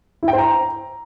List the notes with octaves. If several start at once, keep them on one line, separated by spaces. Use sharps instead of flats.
E4
G5
C5
A#5